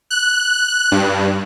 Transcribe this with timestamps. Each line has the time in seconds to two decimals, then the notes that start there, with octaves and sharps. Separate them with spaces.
0.11 F#6
0.92 G2